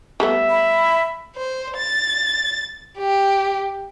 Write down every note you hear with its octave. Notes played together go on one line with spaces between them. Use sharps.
G3 A3 B3 E5
B5
C5
A6
G4